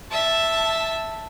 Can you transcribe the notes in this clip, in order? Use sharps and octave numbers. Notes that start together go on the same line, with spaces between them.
E5 A5